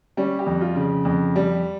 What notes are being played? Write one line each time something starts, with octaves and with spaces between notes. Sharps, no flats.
G3 C#4
G4
F2
F4
C#3
F2
G3